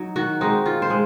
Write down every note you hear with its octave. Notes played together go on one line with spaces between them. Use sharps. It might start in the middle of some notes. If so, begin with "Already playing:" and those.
Already playing: F#3 D#4
D#3 F#4
G#3 C4 D#4
D#3 F4
C5
G#3